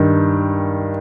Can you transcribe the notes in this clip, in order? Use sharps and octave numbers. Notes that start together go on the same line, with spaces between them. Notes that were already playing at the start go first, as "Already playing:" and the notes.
Already playing: G2 D#3